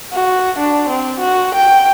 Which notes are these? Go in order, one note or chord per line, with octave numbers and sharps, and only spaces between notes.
F#4
D4
C4
F#4
G5